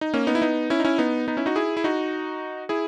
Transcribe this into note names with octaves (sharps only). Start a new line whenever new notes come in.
D#4
A#3 C#4
B3 D#4
E4
B3 D#4
C#4 E4
D#4
C#4 E4
B3 D#4
B3 D#4
C#4 E4
D#4 F#4
E4 G#4
E4
D#4 F#4
E4 G#4